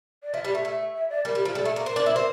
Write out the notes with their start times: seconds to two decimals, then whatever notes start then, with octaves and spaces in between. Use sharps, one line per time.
0.23 D5
0.34 F3 E5
0.45 G3
0.55 A3
0.65 A3
0.95 E5
1.10 D5
1.25 G3 A#4
1.35 G3
1.45 F3
1.55 G3 A4
1.65 A3
1.76 A#3
1.85 C4 A#4
1.96 D4
2.06 E4
2.16 C4